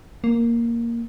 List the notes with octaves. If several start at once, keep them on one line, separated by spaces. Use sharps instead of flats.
A#3